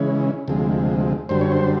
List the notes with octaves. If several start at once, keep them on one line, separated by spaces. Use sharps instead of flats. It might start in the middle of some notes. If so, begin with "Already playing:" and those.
Already playing: C#3 E3 G#3 C#4
D2 C3 F3 G#3
F#2 D3 G3 C5
C#5
C5